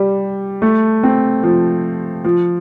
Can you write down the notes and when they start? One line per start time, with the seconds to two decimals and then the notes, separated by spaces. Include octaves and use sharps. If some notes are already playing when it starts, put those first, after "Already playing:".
Already playing: G3
0.62 A3
1.03 C4
1.43 F3
2.24 F3